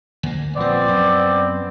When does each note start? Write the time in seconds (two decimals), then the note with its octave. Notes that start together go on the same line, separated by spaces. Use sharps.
0.23 D2 A#3
0.57 A#1 F3 B3 C4 D5
0.89 F#2